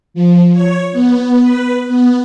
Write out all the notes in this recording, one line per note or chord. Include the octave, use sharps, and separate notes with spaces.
F3
C#5
B3
B4
B3